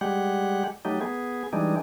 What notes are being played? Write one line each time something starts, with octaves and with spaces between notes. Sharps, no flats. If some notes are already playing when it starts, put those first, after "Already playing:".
G3 G#3 G4 F#5
F#3 A3 D#4 G4
B3 G#4
E3 G3 G#3 D4 D#4